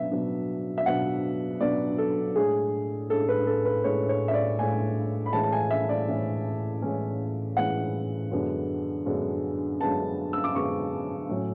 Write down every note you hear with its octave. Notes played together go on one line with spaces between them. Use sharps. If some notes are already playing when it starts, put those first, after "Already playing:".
Already playing: B2 F#3 B3 D4 E5
B2 F#3 B3 D4
E5
B2 F#3 B3 D4 F#5
B2 F#3 B3 D4 D5
A4
A2 G#3 D4 G#4
A2 G#3 D4 A4
B4
A4
B4
A2 G#3 D4 C#5
C#5
E5
D5
A2 G#3 D4 G#5
B5
A2 E3 G#3 C#4 A5
A5
G#5
E5
D5
A2 E3 G#3 C#4
A2 E3 G#3 C#4
A2 E3 G#3 C#4 F#5
F#2 D3 G#3 B3 D4
F#2 D3 G#3 B3 D4
F#2 D3 G#3 B3 D4 A5
E6
D6
F#2 D3 G#3 B3 D4 C#6
A2 F#3 C#4